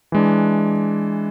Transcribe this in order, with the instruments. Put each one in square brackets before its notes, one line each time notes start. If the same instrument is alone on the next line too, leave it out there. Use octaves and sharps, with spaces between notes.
[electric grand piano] E3 G#3 D4